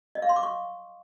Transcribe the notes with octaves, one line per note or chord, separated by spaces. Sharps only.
D#5
F5
C6
D6
C#6